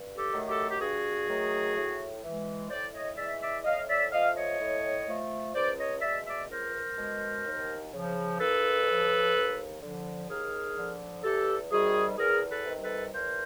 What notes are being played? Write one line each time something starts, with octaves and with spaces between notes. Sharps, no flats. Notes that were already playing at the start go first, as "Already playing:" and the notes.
Already playing: G2
G4 A4
D#3 F#3 A3
G4 A4
G4
G2 F#4 G#4
D#3 F#3 A3
A2
E3 G#3
A2 C5 D5
C#5 D#5
E3 G#3 D5 E5
D5 E5
A2 D#5 F5
D5 E5
F3 A3 D#5 F5
C#5 D#5
A2
F3 A3
C#2 C5 D5
C#5 D#5
B2 G#3 D5 E5
D5 E5
C#2 A#4 C5
B2 G#3
D#2
C#3 F3
D#2 A4 B4
C#3 F3
D#2
D3 F3
D#2 G#4 A#4
D3 F3
E2 G4 A4
C3 D#3 G3 F#4 G#4
E2 G#4 A#4
A4 B4
C3 D#3 G3
A4 B4
E2 A#4 C5